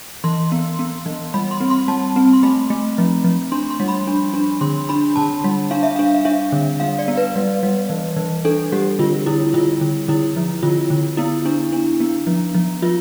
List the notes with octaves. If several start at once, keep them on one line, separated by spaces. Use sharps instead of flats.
E3 C6
B3
B3
E3
G3 B5
C6
C4
C6
G3 A5
C4
C6
A3 B5
A3
F3
F3
D4 C6
C6
G3
B5
D4
D4
D3 C6
D4 B5
D3 A5
G3
D4 F5
E5
D4 F5
F5
D4 E5
D3
G3 F5
D5
B3
B4
G3
G3
E3
E3
D4 A4
G3 G4
D3 F4
D3 E4
D3 F4
D3
D3 E4
F3
D3 F4
D3
B3 E4
D4
D4
B3
F3
F3
F3 F4